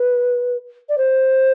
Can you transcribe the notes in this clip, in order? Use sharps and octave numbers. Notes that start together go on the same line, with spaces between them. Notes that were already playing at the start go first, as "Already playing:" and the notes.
Already playing: B4
D5
C5